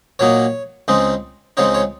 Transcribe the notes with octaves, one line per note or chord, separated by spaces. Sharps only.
A#2 F#3 A#3 D#4 C#5
C#2 C#3 G#3 C4 D#4
C#2 C#3 G#3 C4 D#4 C#5
C#5